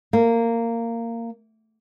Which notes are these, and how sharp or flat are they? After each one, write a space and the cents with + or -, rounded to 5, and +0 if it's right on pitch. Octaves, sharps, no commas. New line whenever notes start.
A#3 -15